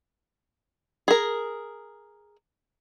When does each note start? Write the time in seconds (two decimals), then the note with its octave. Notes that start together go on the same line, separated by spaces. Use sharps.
1.08 G#4 A#4